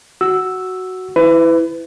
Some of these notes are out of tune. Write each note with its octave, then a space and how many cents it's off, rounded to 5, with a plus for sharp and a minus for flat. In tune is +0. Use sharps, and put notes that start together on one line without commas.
F#4 +5 E6 +0
E4 -5 B4 +25